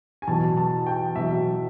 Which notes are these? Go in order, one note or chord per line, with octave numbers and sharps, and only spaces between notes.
G#5
E2 B2 F#3 A5
A5
G5
E2 B2 F#3 E5